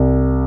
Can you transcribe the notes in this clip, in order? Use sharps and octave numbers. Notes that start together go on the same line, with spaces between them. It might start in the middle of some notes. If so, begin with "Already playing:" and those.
Already playing: C2